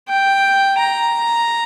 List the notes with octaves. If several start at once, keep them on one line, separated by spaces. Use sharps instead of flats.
G5
A#5